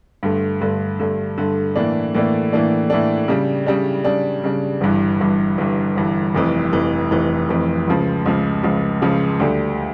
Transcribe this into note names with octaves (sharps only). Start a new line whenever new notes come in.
G2 D3 A3
G2 D3 A3
G2 D3 A3
G2 D3 A3
A2 E3 A#3 D4
A2 E3 A#3 D4
A2 E3 A#3 D4
A2 E3 A#3 D4
C#3 G3 D4
C#3 G3 D4
C#3 G3 D4
C#3 G3 D4
G1 G2 E3
G1 G2 E3
G1 G2 E3
G1 G2 E3
F1 F2 E3
F1 F2 E3
F1 F2 E3
F1 F2 E3
C#2 C#3 F3
C#2 C#3 F3
C#2 C#3 F3
C#2 C#3 F3
D2 D3 G3